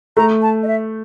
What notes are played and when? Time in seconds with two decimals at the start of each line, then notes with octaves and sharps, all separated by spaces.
0.17 A3 A#5
0.42 A5
0.63 D#5
0.68 E5